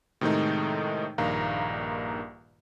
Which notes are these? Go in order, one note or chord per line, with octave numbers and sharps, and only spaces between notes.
A2 C3 D#3 G#3 A3 D#4
A#1 G2 D#3 A#3 F5 A#5